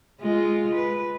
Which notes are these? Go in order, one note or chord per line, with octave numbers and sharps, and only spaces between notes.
G#3 F4
B4